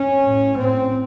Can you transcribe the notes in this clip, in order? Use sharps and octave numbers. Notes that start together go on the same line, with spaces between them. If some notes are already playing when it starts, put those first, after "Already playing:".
Already playing: C#4
A2
A2 C4